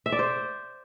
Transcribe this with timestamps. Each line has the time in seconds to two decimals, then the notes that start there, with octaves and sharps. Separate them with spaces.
0.06 E5
0.12 D5
0.19 C5